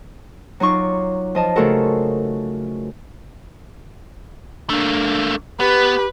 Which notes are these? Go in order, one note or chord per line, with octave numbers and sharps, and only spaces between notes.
F#3 D#4 F4 C#6 D6
F3 D#5 A5
C#3 A3 F4 F#4 A4 A#4
A3 A#3 D4
B3 G4 B4